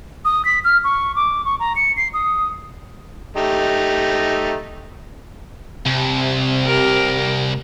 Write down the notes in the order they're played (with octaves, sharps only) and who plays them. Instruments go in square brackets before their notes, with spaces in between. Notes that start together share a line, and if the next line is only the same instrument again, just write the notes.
[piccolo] D#6
B6
F6
C#6
D6
C#6
A#5
C#7
C7
D#6
[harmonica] A3 D#4 G4
[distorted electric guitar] C2 [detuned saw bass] C3
[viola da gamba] G4 A#4